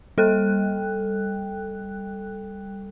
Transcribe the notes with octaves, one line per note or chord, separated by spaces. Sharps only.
G3 A4 G5 F#6